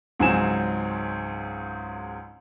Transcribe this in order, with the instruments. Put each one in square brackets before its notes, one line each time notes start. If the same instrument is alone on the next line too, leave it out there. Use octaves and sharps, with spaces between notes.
[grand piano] C#2 G#2 F#3 C4 G#5 E7